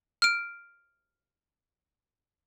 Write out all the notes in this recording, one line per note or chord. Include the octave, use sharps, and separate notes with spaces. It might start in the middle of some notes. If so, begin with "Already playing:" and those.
F6 D7